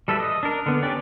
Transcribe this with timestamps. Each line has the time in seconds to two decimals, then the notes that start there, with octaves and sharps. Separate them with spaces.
0.08 G3 A4 B4 E5
0.20 D#5
0.43 D4 A#4
0.66 D3 B3
0.83 C#4 D4 G4 D5